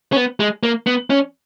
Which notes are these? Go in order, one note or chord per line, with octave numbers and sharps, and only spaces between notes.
C#4
B3
G#3
A#3
B3
C#4